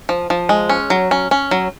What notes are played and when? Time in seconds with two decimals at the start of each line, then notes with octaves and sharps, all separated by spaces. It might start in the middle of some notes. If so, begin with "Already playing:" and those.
0.09 F3
0.30 F3
0.49 G#3
0.69 C#4
0.90 F#3
1.11 C#4
1.31 C#4
1.51 F#3